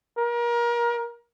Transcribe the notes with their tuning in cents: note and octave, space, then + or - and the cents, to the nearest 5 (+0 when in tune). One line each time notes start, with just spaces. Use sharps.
A#4 +30